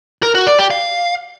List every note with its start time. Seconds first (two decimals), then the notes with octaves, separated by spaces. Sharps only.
0.23 A#4
0.35 F#4
0.47 D5
0.59 G4
0.70 F5